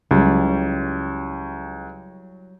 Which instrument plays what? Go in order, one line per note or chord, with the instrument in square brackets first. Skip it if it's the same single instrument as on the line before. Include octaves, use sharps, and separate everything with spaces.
[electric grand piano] C#2 [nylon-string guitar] F#3 G3 E4